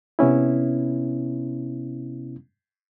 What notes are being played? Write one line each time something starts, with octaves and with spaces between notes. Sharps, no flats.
C3 B3 C#4 E4